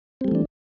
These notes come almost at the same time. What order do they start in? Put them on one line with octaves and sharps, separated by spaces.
C4 G3 A3 E3 D4